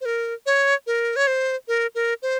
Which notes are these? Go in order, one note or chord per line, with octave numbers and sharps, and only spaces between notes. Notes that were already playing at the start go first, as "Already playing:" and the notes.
C5
A#4
C#5
A#4
C#5
C5
A#4
A#4
C5